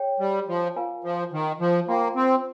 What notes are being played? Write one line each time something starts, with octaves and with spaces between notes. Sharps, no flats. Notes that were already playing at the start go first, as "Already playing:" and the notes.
Already playing: G#4 C#5 G5
G3
F3
F4 A#4 F5 G#5
F3
D#3
F3
A#3 F4 C5 G5 C6
C4